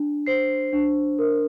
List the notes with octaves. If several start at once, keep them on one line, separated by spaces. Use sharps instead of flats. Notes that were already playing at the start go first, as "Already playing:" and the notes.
Already playing: D4
C5 C7
D4
A#4